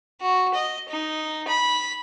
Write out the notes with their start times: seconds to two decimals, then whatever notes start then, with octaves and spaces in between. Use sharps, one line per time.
0.21 F#4
0.54 D#5
0.89 D#4
1.48 B5